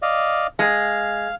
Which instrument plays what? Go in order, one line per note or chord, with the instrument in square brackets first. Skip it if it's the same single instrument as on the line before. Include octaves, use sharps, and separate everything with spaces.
[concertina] D5 D#5 F5
[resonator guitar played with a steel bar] G#3 [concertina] F5